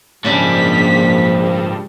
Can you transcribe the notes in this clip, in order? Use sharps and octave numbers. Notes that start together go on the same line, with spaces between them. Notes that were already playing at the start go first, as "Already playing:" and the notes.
A#1 G#2 C#3 F3 G3 D4 B6